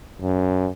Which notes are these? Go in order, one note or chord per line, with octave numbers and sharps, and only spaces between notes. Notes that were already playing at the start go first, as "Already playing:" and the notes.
F#2